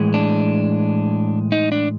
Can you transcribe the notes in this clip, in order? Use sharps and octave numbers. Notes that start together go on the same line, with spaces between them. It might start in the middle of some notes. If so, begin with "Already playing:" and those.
Already playing: A2 E3 G#3
D4
D#4
D4